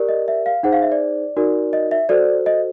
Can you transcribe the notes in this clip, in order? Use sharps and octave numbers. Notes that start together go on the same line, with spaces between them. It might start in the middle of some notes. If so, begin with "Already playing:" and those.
Already playing: G4 A#4 D5
D#5
E5
F5
D#4 G#4 C5 F#5
F5
E5
D5
D#4 F#4 A#4 D5
D#5
E5
F#4 A4 C5 D5
D#5